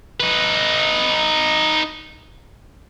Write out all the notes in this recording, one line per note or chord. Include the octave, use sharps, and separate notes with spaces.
D#4 B4